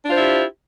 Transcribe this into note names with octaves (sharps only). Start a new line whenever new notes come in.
D4 E4 F4 G4 C5